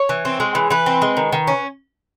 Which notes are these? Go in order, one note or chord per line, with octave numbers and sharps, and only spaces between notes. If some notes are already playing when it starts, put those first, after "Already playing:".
Already playing: C#5
E3
C4
G#3
E3
E3 B4
C4
G#3
D#3
D#3
C#4